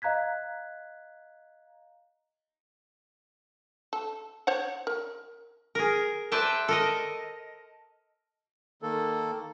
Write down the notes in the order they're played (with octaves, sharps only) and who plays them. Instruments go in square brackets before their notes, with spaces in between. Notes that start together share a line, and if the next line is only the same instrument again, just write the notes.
[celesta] D#5 F5 A#5 F#6 G#6 B6
[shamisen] A4
C5 C#5 F#5
A#4
[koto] G#4 A#4
B4 C5 D5 E5 G5 A5
A4 A#4 D#5
[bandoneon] D#3 A#3 A4